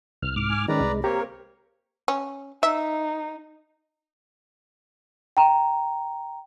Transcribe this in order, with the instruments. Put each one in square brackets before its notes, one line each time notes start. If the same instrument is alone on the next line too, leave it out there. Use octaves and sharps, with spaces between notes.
[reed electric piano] C2 [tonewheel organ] F6
[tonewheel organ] G#2 D6 F6
[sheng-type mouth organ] G#5
[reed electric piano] D#3 C#4 [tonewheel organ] G#3 [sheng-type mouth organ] B4 D5 A#5
[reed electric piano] C2
[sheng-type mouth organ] A#3 C4 C#5 [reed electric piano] G4 A#5 [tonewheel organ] A#4
[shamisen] C#4
[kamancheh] D#4 [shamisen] E5
[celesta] G5 A#5